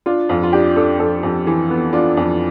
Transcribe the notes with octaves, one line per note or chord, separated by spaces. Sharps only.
D4 F4
F2 F4
F4
D4 G4
D4 A4
F2 A4
F2
E3
B3
D4 F4
F2